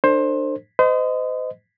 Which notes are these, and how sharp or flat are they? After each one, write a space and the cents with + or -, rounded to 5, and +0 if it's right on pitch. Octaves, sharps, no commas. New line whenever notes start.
D4 +25 A4 +45 C5 +20
C5 -40 D#5 +0